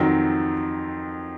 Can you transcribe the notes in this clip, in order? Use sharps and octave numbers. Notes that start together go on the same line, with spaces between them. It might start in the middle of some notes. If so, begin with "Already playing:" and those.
Already playing: F2 D#3 F#3